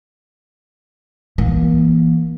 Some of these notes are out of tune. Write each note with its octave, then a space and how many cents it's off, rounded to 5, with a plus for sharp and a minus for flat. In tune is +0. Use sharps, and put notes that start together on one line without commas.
E3 +0 A#3 +30